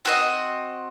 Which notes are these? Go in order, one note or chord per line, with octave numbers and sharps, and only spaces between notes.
C4 F#4 C5 D#5